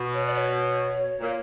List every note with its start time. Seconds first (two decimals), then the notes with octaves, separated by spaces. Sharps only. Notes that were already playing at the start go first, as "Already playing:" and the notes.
Already playing: B2
0.14 C#5
0.27 D5
0.34 C#5
1.20 A#2